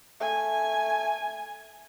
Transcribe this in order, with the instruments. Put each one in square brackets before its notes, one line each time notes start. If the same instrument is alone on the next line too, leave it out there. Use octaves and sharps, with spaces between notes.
[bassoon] A3 [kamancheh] G#5